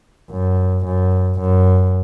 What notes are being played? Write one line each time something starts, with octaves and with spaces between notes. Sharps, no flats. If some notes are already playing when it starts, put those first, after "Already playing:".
F#2
F#2
F#2